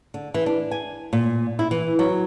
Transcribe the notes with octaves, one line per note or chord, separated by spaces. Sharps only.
D3
E3
D4
G#5
A#2
E4
E3
F#3